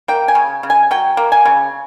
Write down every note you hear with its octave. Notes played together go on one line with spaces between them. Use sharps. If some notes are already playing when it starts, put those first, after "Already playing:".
A#3 G5
G#5
C#3
C#3
G#5
F#3 G5
A#3
G#5
C#3